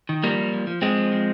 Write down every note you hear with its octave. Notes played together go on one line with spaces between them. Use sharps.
D#3
F3 G3 A#3
F3
F3
F3
F3 G#3 C4
F3
F3